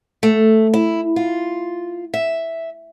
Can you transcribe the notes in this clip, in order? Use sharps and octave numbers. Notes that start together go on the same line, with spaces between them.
A3
E4
F4
E5